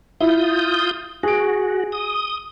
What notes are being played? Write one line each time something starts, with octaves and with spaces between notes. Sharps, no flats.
E4 F4 D#6 G6
F#4 G#4 D7
D#6